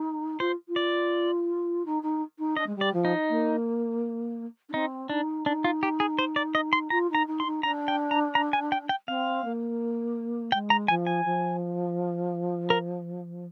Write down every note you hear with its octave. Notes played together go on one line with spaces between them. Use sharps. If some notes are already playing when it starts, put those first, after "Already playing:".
Already playing: D#4
F4 C5
F4
D5
D#4
D#4
D#4
D4 D#5
G#3
G3
D5
F3
D#4
A#3
D4
C4 D#4
D4 D#4
D4 D#4
F4
G4
G#4
C5
D5
D#5
C6
F4 A#5
D#4
A#5
D#4
C6
D#4
D4 A#5
G5
A#5
A#5
G#5
G5
G5
C4 F5
A#3
G#3 G5
A#5
F3 G#5
G#5
F3
A#4